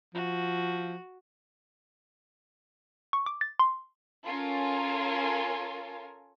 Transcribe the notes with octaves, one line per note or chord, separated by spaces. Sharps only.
F3 F#4
C#6
D6
A6
C6
C#4 F4 A4 A#4 G#5